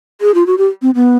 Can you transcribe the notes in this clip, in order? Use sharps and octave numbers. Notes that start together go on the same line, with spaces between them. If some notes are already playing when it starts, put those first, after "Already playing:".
G#4
F4
F#4
G4
C4
B3